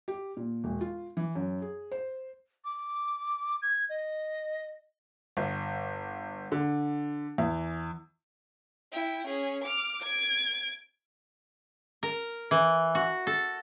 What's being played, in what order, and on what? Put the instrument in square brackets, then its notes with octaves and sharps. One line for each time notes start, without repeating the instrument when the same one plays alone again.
[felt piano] G4
A#2
E1
F4
E3
F#2
G#4
C5
[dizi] D6
G#6
D#5
[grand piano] G1
D3
E2
[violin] E4 G5
C#4 G#4
D6 F6
G#6 D7
[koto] A#4
E3
F#4
A4